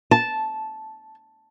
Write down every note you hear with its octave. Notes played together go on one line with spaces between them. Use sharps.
A5